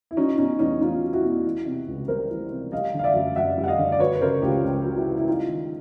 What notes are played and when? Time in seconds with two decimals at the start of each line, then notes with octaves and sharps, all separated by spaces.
0.11 E4
0.17 F#3 C#4 D#4
0.38 B2 C#4 D#4
0.59 E2 C#4 D#4
0.81 E2 D#4 F4
1.03 F#3
1.13 E4 F#4
1.24 B2
1.45 E3
1.66 C3
1.88 C#2
2.08 G3 A#4 C5
2.30 E3
2.51 C3
2.72 G3 D#5 F5
2.94 D3 F5
3.04 D5 E5
3.15 F#2
3.36 F#2 E5 F#5
3.58 G3
3.64 F#5
3.68 D#5 F5
3.79 D3
3.92 D5
4.00 F#3 B4 C#5
4.15 B4
4.21 C#3 A#4 C5
4.42 C#2 F4 G4
4.64 C#2
4.85 F#3
4.95 E4 F#4
5.07 C#3
5.17 E4
5.27 G3 D#4 F4
5.49 D#3